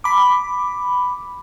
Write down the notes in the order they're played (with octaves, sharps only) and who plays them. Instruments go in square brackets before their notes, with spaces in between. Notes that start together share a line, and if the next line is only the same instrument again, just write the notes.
[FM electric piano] B5 D6